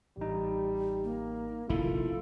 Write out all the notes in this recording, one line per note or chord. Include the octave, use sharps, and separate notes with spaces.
A1 G3 D#4
A#3
F1 A#1 D#3 E4 F4 A4